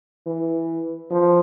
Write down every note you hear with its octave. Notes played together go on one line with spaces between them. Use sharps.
E3
F3